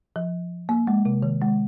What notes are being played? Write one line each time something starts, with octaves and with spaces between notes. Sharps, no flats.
F3
A#3
G#3
C3
D#3
G#3